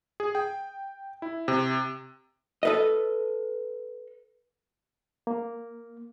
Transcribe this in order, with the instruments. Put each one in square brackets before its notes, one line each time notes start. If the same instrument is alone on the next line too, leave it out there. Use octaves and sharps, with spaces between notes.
[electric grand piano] G#4
G5
E4
C3
[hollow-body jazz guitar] A4 B4 D#5
[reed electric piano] A#3